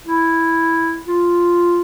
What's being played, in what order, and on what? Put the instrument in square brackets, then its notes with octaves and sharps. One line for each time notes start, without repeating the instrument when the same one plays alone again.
[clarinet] E4
F4